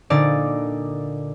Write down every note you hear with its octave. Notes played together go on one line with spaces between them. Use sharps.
A#2 D3 D#4 D5